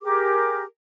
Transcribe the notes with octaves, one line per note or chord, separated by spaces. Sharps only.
G4 G#4 A#4 D6